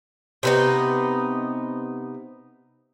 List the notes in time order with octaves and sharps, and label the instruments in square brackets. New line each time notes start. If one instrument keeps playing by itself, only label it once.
[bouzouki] C3 B3 D#4